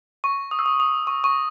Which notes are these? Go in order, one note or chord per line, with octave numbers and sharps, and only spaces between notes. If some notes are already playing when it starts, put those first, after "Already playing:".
C#6
D#6
E6
D#6
D#6
C#6
C#6